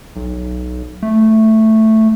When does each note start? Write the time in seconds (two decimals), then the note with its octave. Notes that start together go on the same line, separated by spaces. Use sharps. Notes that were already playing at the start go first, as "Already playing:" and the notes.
0.16 B1
1.03 A3